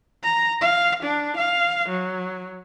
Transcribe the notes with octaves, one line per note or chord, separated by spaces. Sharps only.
A#5
F5
D4
F5
F#3